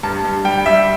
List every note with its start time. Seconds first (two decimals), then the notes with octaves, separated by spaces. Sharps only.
0.03 G2 A5
0.24 G2
0.45 G3 G5
0.66 G3 E5